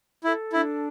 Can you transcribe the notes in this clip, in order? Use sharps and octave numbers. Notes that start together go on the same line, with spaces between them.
E4 A4
D4 E4